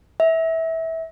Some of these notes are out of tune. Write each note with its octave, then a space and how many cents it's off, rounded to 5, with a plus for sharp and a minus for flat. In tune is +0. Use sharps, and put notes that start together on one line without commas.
E5 -20